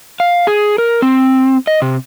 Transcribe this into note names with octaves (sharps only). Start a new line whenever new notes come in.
F5
G#4
A#4
C4
D#5
C3